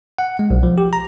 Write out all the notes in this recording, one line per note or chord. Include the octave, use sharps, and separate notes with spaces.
F#5
G#3
B1
F3
G4
A#5